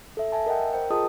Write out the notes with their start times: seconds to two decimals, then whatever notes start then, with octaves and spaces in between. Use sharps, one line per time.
0.17 A4 E5
0.32 E5 G#5 A5
0.46 A#4 D#5 F#5 G5
0.73 A#4 C5 G5
0.90 F4 G#4 A#4 D#5 A5 D#6